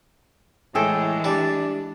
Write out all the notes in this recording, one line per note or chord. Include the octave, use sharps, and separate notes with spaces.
A2 E3 G#3 G#4 A4 G5
G3 D4